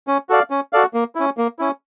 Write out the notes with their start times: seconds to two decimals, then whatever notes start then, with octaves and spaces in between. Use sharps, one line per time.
0.08 C#4
0.29 F#4 A4 D5 F5
0.50 C#4
0.73 F#4 A4 D5 F5
0.94 A#3
1.15 C#4 E4
1.38 A#3
1.59 C#4 E4